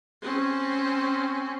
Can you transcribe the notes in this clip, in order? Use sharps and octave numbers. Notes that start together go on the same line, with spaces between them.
C4 C#4